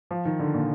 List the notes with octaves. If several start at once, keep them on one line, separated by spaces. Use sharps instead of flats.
F3
D#3
D3
A#2